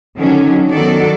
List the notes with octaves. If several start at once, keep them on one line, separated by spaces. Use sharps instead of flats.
D3 D#3 F#3 C#4
D#3 F#3 B3 F#4 A4 D5